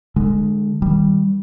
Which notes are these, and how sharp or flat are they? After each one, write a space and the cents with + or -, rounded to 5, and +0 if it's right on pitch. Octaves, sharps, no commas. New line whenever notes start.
D3 +30 G#3 +0
D#3 +20 G3 +0